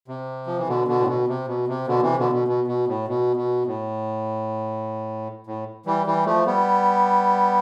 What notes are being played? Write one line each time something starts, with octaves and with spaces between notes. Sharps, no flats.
C3
F3
E3
B2 D3
B2 D3
A2
B2
C3
B2
C3
B2 D3
C3 E3
B2 D3
B2
B2
B2
A2
B2
B2
A2
A2
E3 G3
E3 G3
F3 A3
G3 B3